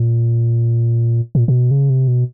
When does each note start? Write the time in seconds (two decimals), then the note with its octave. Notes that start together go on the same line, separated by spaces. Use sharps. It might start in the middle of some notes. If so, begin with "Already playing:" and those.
Already playing: A#2
1.35 A#2
1.48 A#2
1.53 B2
1.71 C#3
1.90 C3
2.08 B2